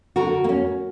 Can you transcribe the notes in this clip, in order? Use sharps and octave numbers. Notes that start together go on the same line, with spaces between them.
D3 F#4 A#4
A#3
C#4